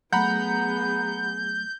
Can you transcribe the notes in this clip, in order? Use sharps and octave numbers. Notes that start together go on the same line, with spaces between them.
F#3 A3 B3 G#4 F#5 A#5 B5 G6